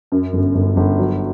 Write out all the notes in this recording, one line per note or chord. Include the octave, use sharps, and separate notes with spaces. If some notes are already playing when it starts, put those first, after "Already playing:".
F#2
G1
G1
G1
F#3